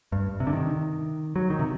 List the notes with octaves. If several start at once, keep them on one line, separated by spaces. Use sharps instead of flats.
G2
C3
D3
D#3
F#3
D#3
C3